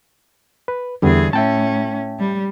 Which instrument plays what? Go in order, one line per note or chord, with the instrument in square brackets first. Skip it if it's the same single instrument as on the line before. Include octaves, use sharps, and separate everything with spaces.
[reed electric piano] B4
[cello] E2 G#4 [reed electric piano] D3 G3 B3
[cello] A2 C#4 [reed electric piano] E5 G5 A5
[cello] G3